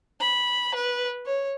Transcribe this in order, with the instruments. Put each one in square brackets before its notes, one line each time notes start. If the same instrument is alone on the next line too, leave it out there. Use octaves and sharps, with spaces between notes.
[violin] B5
B4
C#5